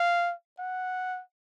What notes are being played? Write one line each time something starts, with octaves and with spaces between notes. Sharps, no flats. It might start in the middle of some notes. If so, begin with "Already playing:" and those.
Already playing: F5
F#5